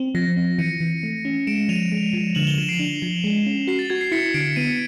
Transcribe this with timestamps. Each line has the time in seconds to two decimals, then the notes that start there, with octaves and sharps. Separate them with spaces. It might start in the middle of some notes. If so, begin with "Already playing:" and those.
Already playing: C4
0.15 F3 A#6
0.36 C4
0.58 E3 C#7 D#7
0.80 E3
1.03 A3
1.25 C#4
1.47 G#3 D7 E7
1.69 F3 D#7 F7
1.92 G#3
2.13 F3
2.35 D3 E7 F#7
2.47 F7 G7
2.58 F3 E7 F#7
2.68 C7 D7
2.79 D4
3.02 F3
3.24 G#3
3.46 C#4
3.67 F#4 C7
3.79 A6
3.90 F#4 G#6
4.01 C7
4.12 E4 B6 C#7
4.34 D3 C7 D7
4.56 B3 C#7 D#7